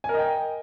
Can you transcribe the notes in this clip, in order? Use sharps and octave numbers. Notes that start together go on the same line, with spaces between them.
A#4 D#5 G5 G#5